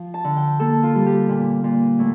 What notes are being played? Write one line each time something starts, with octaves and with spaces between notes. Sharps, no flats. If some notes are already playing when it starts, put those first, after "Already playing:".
Already playing: F3
A5
D3
G5
A#3 A4
F4
G3
G4
A#2
A#2
A2